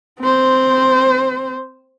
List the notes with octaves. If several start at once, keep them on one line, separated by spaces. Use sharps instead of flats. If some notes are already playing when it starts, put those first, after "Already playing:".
C4 C5